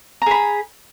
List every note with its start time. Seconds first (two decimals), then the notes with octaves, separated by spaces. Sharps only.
0.22 A#5
0.26 G#4
0.31 B5